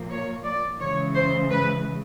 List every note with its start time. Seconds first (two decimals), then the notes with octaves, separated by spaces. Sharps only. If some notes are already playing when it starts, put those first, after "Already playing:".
Already playing: A#2 F3 A#3
0.10 C#5
0.44 D5
0.79 C#3 E3 G#3 C#5
1.14 C5
1.50 B4